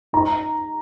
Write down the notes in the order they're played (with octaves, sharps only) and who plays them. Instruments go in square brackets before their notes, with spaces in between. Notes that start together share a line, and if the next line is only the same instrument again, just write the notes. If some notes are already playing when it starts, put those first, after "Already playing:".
[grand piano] D#4 A#5